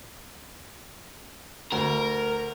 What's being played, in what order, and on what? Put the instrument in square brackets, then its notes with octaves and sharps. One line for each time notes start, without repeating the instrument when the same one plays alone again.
[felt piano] D2 [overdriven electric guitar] A#4